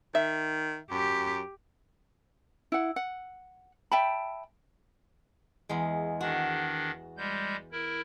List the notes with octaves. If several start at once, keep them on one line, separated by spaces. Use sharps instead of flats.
D#3 E5
F#2 G4
E4 F#5
F#5
E5 G5 A5 B5
E2 G#3
D#3 D4 F#4
G3 G#3 G6
E4 A#4